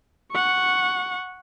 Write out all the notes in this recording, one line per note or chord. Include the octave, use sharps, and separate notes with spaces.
F#5 C#6